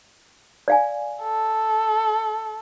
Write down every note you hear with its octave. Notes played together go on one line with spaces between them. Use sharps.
D5 F5 G#5
A4